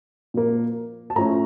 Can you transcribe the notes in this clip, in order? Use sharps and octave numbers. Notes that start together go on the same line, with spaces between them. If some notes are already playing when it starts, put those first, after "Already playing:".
A#2 F3 A#3
A5
A2 F3 A3 C#4 A#5